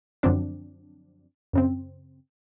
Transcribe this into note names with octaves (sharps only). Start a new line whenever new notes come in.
F#2 D3 F3 F#3 C4 D4
F#2 C#3 C4